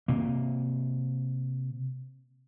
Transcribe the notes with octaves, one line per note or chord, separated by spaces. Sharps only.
C3 A#3